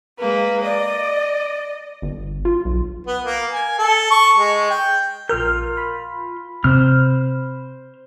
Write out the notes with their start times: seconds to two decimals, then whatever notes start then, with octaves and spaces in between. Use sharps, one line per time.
0.19 G#3 A#3 B4
0.64 D5 D#5
2.02 G1
2.45 F4
2.65 B1
3.07 B3
3.24 A#3
3.52 G#5
3.78 A4
4.10 C#6
4.37 G#3
4.70 G5
5.29 A#1 F4 A#4 F6 G6
5.77 B5
6.64 C3 C4 C5 F6